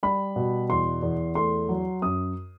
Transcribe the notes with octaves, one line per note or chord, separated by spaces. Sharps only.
G3 B5
B2
E2 C6
E2
A3 C6
F#3
F#2 D#6